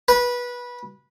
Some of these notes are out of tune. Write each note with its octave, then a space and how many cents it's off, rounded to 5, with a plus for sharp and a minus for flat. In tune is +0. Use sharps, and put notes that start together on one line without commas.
B4 -20